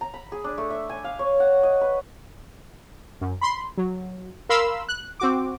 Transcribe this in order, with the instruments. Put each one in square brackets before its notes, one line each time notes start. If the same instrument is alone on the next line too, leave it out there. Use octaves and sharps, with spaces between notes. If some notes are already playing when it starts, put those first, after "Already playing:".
[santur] A#5
B5
G#4
D4
A3
E5
G#5
F5
C#5
F#5
D#5
B4
[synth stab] F#2
B5 C6
F#3
A#4 F5 B5 C6 E6
F#6
C4 F#4 D6